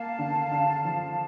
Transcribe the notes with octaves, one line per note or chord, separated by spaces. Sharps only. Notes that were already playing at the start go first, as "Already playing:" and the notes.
Already playing: A#3 F5 A5
D3
D3
F3